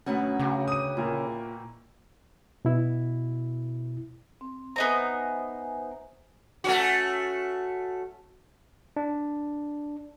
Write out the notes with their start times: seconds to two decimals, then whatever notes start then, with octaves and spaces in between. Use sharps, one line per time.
0.06 D2 B2 F#3 C#4 F#5 B5
0.40 C#3 F#4 G4
0.68 D#6 D#7
0.97 A#2 A#3 E4
2.65 B2 E4
4.41 C4
4.76 B3 D#4 C5 E5 G#5 A#5
6.64 A3 C#4 F#4
8.96 D4